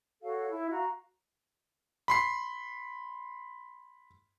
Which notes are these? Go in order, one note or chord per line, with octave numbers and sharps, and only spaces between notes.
F#4 A4 C#5 F5
E4 E5
F#4 F5 A#5
B5 C6 C7